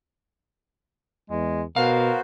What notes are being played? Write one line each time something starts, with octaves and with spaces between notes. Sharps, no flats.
E2 G#3
B2 B3 F#4 A#4 C5 F5